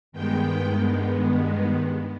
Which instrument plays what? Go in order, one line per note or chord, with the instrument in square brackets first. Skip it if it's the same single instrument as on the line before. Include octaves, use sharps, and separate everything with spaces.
[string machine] G2 D#3 G#3 B3 G5